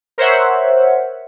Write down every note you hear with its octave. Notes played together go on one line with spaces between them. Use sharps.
A#4 C5 C#5 E5 F#5